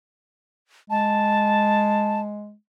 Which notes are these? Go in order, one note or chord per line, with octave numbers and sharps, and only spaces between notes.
G#3 A5